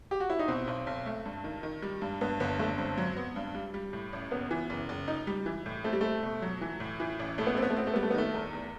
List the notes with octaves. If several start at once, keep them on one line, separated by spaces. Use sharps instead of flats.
G4
F#4
E4
D#4
B2 C4
B1
B1
A3
G2
D#3
D#3
G3
G2
G2 B3
G1 B3
G1 A3
G2 C4
F#3
B3
G2
G3
G3
A2
A1
F#1 B3
E3
F#1
F#1
D#4
G3
E3
A2
A3 C4
G3
A3 C4
B2
F#3
E3
A2
E3
A1
A2 A3
B3
A3 C4
B3
A3
B3 C4
A3
G3 B3
A3
B3
D#3 A3
E2
E2